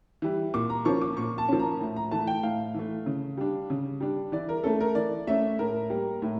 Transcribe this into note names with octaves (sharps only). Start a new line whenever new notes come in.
E3 G3
A#2 D6
A#5
F3 A#3 C#4 C#6
D6
A#2 C#6
A5
F3 A#3 C#4
A#5
A2
A#5
E3 A3 A5
G5
A2 F5
E3 A3
C#3
G3 D4
C#3
G3 D4
E3 D5
A#4
A3 C#4 A4
A#4
E3 D5
A3 C#4 E5
A2 A#4
G3 A#3
A2